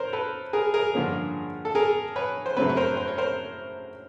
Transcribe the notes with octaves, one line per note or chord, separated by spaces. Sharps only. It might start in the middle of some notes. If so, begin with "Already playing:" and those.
Already playing: A#4 C5 C#5
A4 B4
G#4 A#4
G#4 A#4
G2 D3 F3 A#3 C#4
A4
G#4 A#4
B4 C#5
C5
F#2 C#3 F#3 A3 C4 B4 C#5
C#5
A#4 C5
C5
C#5
A#4 C5